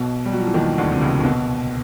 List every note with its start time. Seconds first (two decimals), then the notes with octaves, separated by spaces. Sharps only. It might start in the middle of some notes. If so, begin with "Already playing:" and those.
Already playing: B1 B2
0.26 G3
0.33 F#3
0.40 F3
0.47 E3
0.54 D#2 D#3
0.78 D2 D3
0.92 C3
1.01 C#2 C#3
1.20 A#2
1.24 B1 B2